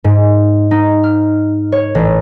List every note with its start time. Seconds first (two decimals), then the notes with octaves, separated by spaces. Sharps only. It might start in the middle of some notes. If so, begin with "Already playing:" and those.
0.04 G#2
0.71 D#4
1.03 F6
1.72 C#5
1.95 A1